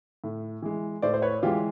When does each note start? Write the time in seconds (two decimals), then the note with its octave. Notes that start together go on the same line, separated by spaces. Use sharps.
0.24 A2
0.62 E3 G#3
1.02 A2 C5 D5
1.14 C5
1.22 B4 C#5
1.43 E3 G#3 F4 G4